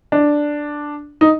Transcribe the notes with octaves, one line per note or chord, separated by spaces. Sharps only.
D4
D#4